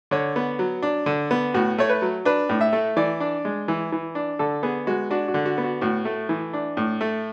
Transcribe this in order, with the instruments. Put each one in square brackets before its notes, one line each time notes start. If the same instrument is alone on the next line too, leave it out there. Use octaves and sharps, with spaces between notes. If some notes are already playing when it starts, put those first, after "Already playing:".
[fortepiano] D3 C#5
B3
F#3
D4
D3
B3
A2 F#4
A3 C#5
B4
F#3
D4 B4
A2
E5
A3
E3 D5
D4
G#3
E3
E3
D4
D3 A4
B3 G#4
G#3 F#4
D4 F#4
F#4
D3
F#4
B3
F#4
A2 F#4
A3
E3
D4
A2
A3